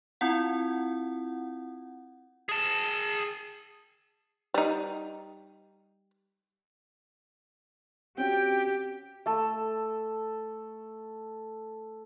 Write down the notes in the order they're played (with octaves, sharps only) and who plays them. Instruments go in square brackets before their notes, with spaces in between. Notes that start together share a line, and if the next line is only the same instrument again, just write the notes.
[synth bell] C4 E4 F4 F#5
[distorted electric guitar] G#4 A5
[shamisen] G3 D#4
[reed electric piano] C4 C#4 F#4 [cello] G4 [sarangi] G5
[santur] A3 A4